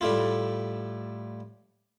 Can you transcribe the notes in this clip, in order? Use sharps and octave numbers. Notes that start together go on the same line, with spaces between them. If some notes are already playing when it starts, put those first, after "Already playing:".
A2 G3 A3 E4 F4